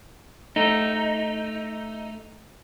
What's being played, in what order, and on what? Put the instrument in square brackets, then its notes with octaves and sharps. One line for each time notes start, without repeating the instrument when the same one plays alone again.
[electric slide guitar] A3 D#4